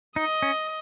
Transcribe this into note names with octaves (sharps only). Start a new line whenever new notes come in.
D#4 D#5
C#4